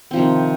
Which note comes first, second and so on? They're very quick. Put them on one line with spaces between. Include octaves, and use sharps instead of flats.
C4 F3 C3 D#3